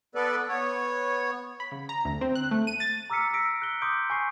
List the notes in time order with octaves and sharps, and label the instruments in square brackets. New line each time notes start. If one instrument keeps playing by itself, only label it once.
[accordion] B3 A4 B4 D5
B3 C#5
[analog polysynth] B5
C#3
A#5
D2
C4
F#6
A3
D#7
A6
[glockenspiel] A#5 D6 E6 F6 B6 C#7
E6 A#6 B6 D7
F#6 G7
C6 D6 D#6 G6 D7
G#5 C#6 C7